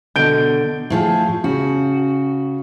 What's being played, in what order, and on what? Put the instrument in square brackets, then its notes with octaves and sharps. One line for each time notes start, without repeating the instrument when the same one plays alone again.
[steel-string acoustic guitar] B2 D3 [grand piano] G6 D7
[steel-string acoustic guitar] A2 F3 G#4
[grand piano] C#3 [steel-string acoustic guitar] F#4